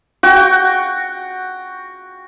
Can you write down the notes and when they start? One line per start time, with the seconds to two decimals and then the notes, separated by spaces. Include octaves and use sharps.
0.23 F#4 G5